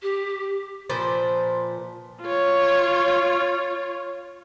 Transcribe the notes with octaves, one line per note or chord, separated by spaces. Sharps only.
G4
A#2 F3 B4 C5
F4 C#5